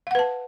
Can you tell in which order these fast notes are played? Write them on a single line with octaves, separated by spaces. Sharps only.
F5 F#5 B4 A5